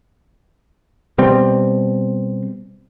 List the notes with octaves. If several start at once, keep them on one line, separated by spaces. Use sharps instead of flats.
B2 G3 C4